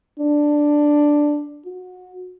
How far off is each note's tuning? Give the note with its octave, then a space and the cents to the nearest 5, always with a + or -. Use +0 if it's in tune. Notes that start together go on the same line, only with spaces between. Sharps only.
D4 +5
F#4 -25